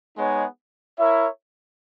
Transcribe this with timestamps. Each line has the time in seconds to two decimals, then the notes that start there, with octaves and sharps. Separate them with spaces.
0.17 G#3 B3 D#4 G#4 C#5
0.99 E4 A#4 C#5 E5